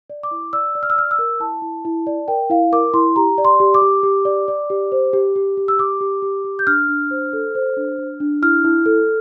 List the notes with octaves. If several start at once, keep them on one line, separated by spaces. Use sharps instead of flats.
D5
D6
E4
D5 E6
D5
F6
E6
D5 F6
E6
A#4
E4 A5
E4
E4
D5
A#4 G5
E4 F5
A#4 D6
E4 C6
G4 A#5
D5
C6
G4
D6
G4
G4
D5
D5
G4
C5
G4
G4
G4
E6
G4 D6
G4
G4
G4
G6
D4 F6
D4
C5
A4
C5
D4
D4
D4
E4 F6
E4
A4